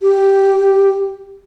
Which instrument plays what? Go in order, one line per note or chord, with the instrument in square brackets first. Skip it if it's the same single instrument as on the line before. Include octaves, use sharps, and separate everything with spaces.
[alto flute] G4